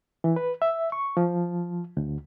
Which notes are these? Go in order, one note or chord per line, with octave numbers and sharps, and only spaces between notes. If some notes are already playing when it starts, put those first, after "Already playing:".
E3
B4
E5
C#6
F3
D2